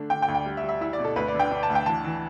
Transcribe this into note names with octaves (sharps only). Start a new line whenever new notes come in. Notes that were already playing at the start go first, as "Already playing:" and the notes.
Already playing: D3 A3 D4
D3 G5
G5
D2
G5
G3
E5
G3
E5
E4 E5
D5
B2
A4
D2 B4
D5
D3
G5
D4
A5
D2
G5
E3 A5
E3